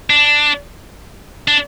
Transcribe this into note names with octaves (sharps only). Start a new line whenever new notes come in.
D4
D4